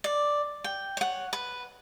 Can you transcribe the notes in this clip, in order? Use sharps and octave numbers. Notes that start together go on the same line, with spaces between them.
D5
G5
C#5 F#5
B4